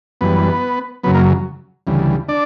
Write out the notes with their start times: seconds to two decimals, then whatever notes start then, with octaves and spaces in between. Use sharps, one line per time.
0.21 F#2 E3 G3 B3 B4
1.03 F#2 C#3 F#3 B3 B4
1.14 A#3 A#4
1.87 D2 C#3 E3 G3
2.28 D4 D5